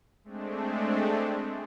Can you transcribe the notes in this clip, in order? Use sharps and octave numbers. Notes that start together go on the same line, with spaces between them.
G#3 A3 C4 D4